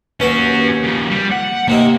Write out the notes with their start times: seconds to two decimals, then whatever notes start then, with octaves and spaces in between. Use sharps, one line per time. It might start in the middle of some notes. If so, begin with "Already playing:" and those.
0.20 D#2 C#4 F#4 B4
0.83 C#3 F3
1.10 G3
1.31 F#5
1.68 D#2 C3 A#3 D#4